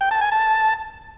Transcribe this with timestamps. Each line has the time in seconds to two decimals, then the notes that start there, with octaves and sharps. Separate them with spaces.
0.01 G5
0.11 A5
0.21 G#5
0.32 A5